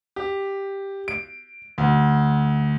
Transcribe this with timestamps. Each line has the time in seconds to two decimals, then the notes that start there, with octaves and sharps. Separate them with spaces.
0.16 G4
1.08 D7
1.78 D2